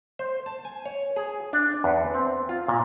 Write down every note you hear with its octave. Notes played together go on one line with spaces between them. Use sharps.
C5
A5
G#5
C#5
G#4
D4
E2
C4
F4
A#2